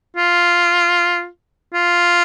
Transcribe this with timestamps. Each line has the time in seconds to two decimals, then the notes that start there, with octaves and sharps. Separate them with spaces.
0.17 F4
1.74 F4